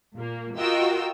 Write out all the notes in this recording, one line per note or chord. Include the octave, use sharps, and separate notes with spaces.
A#2 A#3
F4 F#4 A#4 D#5 G5 E6